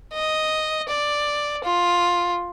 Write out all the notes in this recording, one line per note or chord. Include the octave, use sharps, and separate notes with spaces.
D#5
D5
F4